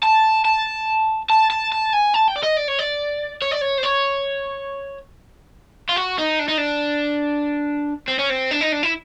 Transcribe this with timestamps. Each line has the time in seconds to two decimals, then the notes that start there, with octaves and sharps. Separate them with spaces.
0.03 A5
0.45 A5
1.30 A5
1.50 A5
1.72 A5
1.93 G#5
2.14 A5
2.28 G5
2.36 D5
2.43 D#5
2.57 D5
2.68 C#5
2.79 D5
3.42 C#5
3.51 D5
3.61 C#5
3.78 C5
3.84 C#5
5.89 F4
5.96 F#4
6.18 D#4
6.39 D4
6.48 D#4
6.58 D4
8.08 C4
8.19 C#4
8.30 C4
8.51 D4
8.61 D#4
8.72 D4
8.83 E4